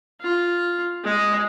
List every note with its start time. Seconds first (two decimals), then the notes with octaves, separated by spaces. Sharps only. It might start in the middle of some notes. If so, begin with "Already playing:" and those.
0.21 F4
1.04 G#3